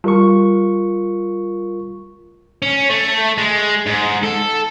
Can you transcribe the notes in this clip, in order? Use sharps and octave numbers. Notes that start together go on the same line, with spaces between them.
G3 F4 A#4 C#6
C#4
A3
G#3
G#2
A4